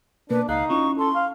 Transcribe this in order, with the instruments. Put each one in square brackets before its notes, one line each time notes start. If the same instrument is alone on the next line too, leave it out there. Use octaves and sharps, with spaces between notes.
[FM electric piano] B2 A#3 A#4 [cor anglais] D4 [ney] B4
[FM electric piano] C#2 G#4 F#6 [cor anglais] D#4 [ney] F5
[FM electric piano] C#4 E4 F4 [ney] C#6
[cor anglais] A4 [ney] C6
[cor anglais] F5